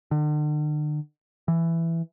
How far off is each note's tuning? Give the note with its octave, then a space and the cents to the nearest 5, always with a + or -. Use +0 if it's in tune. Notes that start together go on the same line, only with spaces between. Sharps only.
D3 +40
E3 +10